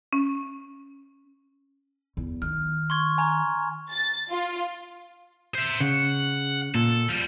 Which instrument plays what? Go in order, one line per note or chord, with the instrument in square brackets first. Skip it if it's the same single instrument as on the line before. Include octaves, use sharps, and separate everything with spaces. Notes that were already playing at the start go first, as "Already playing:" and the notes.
[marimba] C#4
[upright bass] E2
[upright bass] D#3 [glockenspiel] F6
[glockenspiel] C6 C#6 G#6
G#5 A#5 G#6
[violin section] A6
F4
[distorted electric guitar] C5 E5
[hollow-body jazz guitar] C#3 [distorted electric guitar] F#5
[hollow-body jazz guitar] A#2 [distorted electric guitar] A4
[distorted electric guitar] F3 G3